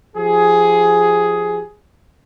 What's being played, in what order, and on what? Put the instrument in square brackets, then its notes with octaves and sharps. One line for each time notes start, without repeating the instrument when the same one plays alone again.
[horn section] F3 G4 G#4